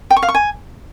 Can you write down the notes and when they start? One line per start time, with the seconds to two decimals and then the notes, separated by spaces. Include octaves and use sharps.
0.11 G5
0.17 C#6
0.23 F5
0.29 C#6
0.35 G#5